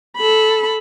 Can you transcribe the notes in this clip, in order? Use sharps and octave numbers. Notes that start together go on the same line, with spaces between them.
A4 B5